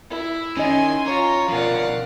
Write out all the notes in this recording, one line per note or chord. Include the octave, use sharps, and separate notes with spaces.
E4
D#3 C#4 D#5 G#5 C6
F4 C#5 A#5
B2 F3 A#4 D5 F5 F#5